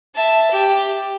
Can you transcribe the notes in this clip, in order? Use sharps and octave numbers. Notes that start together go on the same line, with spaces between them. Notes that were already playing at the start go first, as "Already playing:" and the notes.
E5 A5
G4